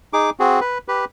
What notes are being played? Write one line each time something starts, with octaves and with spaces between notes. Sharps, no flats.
D#4 G#4 D6
C4 F#4 G#4
B4
G4 B4